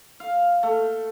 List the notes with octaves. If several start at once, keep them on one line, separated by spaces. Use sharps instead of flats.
F5
A3